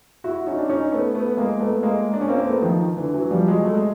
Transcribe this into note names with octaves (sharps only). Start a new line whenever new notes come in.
E4 F#4
C#4 D#4
D4
C#4 D#4
A3 B3
A3 B3
G#3 A#3
A3 B3
G#3 A#3
D4
C#4
A#3 C4
A3 B3
D#3 F3
D3 E3
E3 F#3
F3 G3
F#3 G#3
A3
G#3